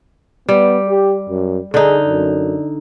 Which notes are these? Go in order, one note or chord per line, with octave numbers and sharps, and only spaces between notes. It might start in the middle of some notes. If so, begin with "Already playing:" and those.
G3 B3
G4
F#2
D3 D#4 G#4
F#2